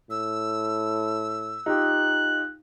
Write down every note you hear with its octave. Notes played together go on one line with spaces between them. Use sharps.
A2 E6
D#4 F4 G4 F#6